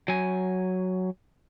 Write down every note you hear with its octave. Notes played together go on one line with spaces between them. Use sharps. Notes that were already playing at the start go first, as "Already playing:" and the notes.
F#3 G#5